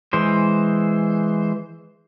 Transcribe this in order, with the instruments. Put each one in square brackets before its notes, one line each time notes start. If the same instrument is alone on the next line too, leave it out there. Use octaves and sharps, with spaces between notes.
[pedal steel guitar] E3 G#3 C5